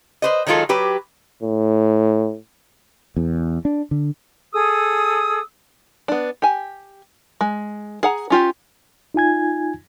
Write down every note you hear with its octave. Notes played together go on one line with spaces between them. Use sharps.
B4 C5 D#5
D#3 F#3 G#3 F4 A4
F#3 G4 B4
A2
E2
D4
D3
G#4 A4 D#6 E6
B3 D4
G4 G#5
G#3
G#4 F#5 A#5
C#4 F4 G4
D#4 F4 G#5 G#6